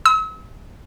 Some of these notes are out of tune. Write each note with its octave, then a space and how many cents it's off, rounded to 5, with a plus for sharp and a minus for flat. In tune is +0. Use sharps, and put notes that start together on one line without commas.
C6 -40 E6 -40